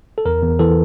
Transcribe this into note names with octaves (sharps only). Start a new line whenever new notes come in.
A4
E2 A#4
E2
E3 A4